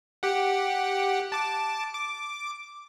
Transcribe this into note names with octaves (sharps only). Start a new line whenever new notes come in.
G4 F#5
A5 D6
D6